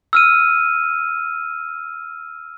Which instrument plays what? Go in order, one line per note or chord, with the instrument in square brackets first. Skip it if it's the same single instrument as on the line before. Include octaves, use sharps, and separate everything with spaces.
[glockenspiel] E6 F6 D#7